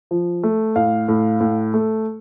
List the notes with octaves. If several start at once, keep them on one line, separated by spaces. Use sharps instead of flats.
F3
A3
A2 F5
A2
A2
A3